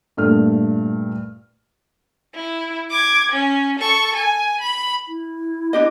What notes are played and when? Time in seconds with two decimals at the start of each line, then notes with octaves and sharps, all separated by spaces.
0.17 G2 A#2 A3 F6
2.35 E4
2.91 D6 G#6
3.32 C#4
3.80 A4 C#6
4.17 G#5
4.61 B5
5.08 E4
5.73 D4 G4 D#5